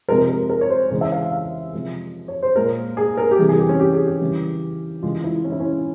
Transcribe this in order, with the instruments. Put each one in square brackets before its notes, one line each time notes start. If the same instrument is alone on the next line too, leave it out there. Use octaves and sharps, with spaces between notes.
[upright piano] C3 F3 G#3 A#4
A#4
A#4
C#5
C5
C#3 E3 G#3 C#5
E5
F5
F5
F5
C3 F3 G#3
C#5
C5
A#2 G#3 A#4
G#4
A#4
G4
C3 E3 G3 G#4
G#4
G4
C#4
G4
G#4
G4
C#3 E3 G3
C#3 E3 G#3 F4
F4
E4
C#4
E4
C#4